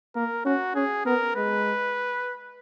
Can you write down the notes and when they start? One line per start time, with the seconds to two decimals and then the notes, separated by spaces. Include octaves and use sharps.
0.15 A#3 A#4
0.45 C#4 F#4
0.75 C#4 G#4
1.05 B3 A#4
1.36 G#3 B4